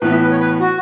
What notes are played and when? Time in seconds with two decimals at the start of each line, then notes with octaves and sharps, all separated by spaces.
0.02 A2 E3 B3 B4
0.11 E5
0.21 B4
0.32 C#5
0.40 B4
0.60 F#4